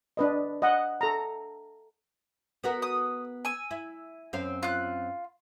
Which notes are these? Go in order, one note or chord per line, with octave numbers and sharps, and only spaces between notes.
D4 B4 D#5
D#5 F#5
A4 A#5
B3 F#4 A#4
D#6
G#5 E6
E4
F#2 C4 F5
F4 F#6